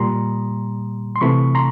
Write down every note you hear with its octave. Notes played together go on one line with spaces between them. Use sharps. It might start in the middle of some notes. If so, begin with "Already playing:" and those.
Already playing: A#2 G3 A#5 C6
C6
C3 E3 A3 B5 C#6
A#5 C6